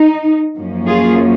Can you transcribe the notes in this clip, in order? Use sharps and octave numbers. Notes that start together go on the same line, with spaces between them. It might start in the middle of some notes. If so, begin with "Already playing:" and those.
Already playing: D#4
F#2 F3 A#3 C#4
F4 G#4